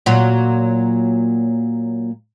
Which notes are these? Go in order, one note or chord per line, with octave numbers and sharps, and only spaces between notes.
A#2 F#3 F4